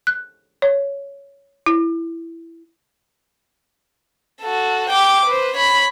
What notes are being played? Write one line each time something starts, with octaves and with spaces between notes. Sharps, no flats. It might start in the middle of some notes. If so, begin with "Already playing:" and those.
F#6
C#5
E4
F#4 A4
G5 D6
B4 C5
C#5 B5